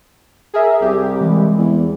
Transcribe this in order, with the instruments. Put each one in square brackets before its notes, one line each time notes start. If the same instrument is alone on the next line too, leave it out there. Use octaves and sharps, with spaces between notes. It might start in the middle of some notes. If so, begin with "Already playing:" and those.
[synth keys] G#4 A#4 E5
[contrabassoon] C2 [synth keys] G4
[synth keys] E3 G#3
[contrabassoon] E2